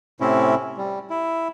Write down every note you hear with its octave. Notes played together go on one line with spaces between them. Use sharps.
A2 C3 C4 C#4 E4
G3
E4